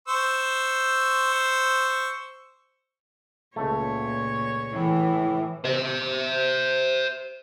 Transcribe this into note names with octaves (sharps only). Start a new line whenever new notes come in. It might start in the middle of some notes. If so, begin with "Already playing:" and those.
C5 C#6 E6
C#2 A#2 A3 C#5
A2 E3
C5 E5